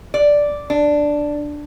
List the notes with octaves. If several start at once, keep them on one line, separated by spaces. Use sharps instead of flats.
D5
D4